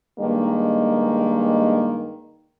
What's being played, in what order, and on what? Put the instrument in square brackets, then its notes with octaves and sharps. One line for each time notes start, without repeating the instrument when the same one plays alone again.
[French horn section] G2 D#3 G#3 A#3